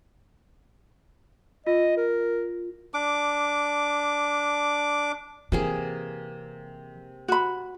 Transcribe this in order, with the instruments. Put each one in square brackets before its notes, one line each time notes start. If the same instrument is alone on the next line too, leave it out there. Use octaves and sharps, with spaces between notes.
[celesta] F4 [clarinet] D#5
[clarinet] A#4
[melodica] D4 D6
[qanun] C3 A#3 G#4 [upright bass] E3
[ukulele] F#4 B5